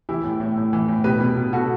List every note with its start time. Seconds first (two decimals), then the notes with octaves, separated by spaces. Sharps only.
0.09 E3 E4 G4
0.24 A2
0.40 A2
0.57 A2
0.73 E3
0.88 A2
1.04 B2 G4 B4
1.21 B2
1.37 B2
1.53 B2 F#4 A4